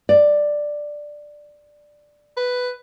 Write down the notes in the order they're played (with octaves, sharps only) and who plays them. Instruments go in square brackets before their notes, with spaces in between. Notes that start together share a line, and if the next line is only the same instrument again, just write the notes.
[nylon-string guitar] D5
[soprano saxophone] B4